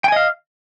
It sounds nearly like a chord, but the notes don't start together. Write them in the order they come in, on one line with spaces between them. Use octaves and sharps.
G5 G#5 D#5 F5